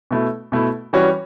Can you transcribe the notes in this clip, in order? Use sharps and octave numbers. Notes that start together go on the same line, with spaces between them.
B2 A3 E4
B2 A3 E4
E3 G3 C#4 F#4 C#5